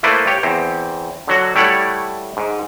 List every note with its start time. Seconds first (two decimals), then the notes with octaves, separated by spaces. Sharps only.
0.03 A3 A#3 E4 B4 C5 D5
0.27 G4 C#5
0.43 E2 C4
1.27 D3 F#3 F#4
1.55 G3 A3 E4 C#5 D5 F#5
2.37 G#2